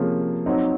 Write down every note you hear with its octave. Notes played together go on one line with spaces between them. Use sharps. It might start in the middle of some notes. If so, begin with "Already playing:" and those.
Already playing: C3 F3 A#3 C#4 G#4
F#3 C4 D#4